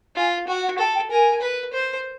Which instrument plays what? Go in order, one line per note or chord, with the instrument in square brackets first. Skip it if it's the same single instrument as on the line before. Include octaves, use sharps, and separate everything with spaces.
[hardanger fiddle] F4 [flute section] G#5
[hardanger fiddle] F#4 [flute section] G5
[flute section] F#5
[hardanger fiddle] A4 [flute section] G5
[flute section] G5
[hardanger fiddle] A#4 [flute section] G#5
[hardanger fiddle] B4
C5